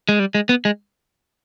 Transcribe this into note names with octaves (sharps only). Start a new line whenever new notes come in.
G#3
G3
G#3
B3
G#3